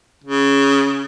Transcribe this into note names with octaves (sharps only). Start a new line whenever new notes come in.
C#3